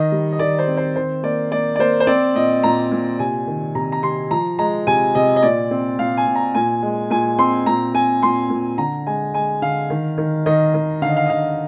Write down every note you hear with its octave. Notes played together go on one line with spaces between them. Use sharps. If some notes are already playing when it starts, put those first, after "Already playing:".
Already playing: D#3 D#5
G3
D#5
D#3 D5
C5
C4
C5
D#3 C5
A#3 D5
A#3 D5
D5
A#3 C5
C5
C4 D5
A#2 D#5
A#2 A#5
A#2
C3 G#5
D#3
C3 A#5
A#5
C3 C6
F3 A#5
G#3 A#5
C3 G#5
C3 D#5
D#5
A#2 D5
C4
A#2 F5
G#5
A#2
A#5
A#2 G#5
G#3
A#2 G#5
C4 C6
A#2 A#5
C4 G#5
A#2 C6
A#2
D3 A#5
G#3 G#5
G#3 G#5
D3 F5
D#3
D#3
D#3 D#5
D#3
D3 F5
D#5
F5
D#5
D3 F5